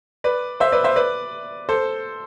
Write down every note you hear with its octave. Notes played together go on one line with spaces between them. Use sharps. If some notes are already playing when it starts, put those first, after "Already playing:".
B4 D5
C5 E5
B4 D5
C5 E5
B4 D5
A4 C5